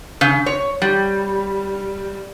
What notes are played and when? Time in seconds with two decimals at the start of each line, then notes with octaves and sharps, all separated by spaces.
0.21 C#3
0.46 C#5
0.82 G3